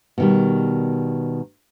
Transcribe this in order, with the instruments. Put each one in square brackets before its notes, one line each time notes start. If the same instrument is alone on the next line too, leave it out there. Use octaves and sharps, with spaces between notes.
[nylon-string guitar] B2 D#3 G3